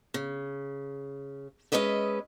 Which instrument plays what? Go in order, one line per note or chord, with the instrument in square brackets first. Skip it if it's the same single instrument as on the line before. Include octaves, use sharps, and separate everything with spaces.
[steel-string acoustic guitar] C#3
G#3 C#4 B4 D#5 E5